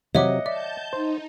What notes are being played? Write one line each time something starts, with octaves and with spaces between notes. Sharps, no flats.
C3 F#3 C#5 D#5 E5 F#5 D6
D5 E5 A5 G6
D#4 C5